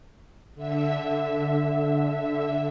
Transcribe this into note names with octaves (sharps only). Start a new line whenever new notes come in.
D3 E5